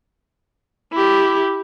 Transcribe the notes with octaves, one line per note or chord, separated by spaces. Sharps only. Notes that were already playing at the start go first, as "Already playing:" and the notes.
E4 G4